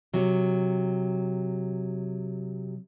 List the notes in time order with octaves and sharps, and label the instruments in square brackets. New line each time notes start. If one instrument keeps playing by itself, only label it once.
[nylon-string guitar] C3 F#3